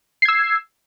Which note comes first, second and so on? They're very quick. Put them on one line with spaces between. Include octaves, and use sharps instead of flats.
C7 G#6 E6